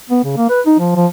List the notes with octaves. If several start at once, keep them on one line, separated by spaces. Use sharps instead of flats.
B3
C#3
A#3
B4
D#4
F3
F3